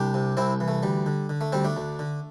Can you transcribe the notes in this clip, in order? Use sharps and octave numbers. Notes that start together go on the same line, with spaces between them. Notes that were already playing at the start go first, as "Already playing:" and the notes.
Already playing: C2 D4 G4
C3
C2 C4 E4
E3
A3
D2 G3
D3
D3
A3
D2 G3 C4
A3 D4
D2
D3